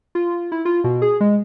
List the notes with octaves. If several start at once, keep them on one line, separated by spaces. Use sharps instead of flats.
F4
E4
F4
B2
G#4
G#3